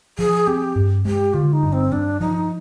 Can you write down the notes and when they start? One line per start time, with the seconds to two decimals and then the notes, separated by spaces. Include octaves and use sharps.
0.18 F3 G#4
0.47 C4 G4
0.76 G2
1.05 G#3 G4
1.33 D3 F4
1.53 D#4
1.63 G2
1.73 C4
1.92 G2 D4
2.20 F3 D#4